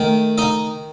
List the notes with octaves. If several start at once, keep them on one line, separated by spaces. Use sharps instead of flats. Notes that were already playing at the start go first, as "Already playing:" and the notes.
Already playing: D#3 A3
D#4 D#5